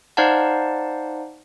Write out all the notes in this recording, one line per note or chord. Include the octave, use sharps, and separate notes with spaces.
D#4 C5 D5 F5 F#5 A5